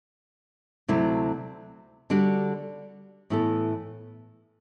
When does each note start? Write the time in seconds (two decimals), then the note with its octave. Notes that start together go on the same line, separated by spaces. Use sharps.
0.88 D2 C3 F#3 A3 E4
2.10 D3 G3 D4 F#4
3.30 A2 E3 B3 E4 A4